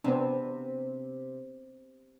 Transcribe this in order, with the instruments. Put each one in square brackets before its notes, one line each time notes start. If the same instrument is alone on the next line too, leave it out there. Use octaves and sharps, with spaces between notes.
[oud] C3 [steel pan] B3 C4 D4